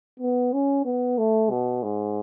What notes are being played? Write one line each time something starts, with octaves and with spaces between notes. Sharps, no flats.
B3
C#4
B3
A3
B2
G#2